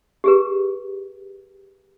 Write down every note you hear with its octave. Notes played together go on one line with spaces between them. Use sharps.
G4 G#4 B4